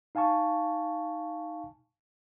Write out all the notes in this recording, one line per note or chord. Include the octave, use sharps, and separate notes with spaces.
D#4 F5 G#5 A5 C#6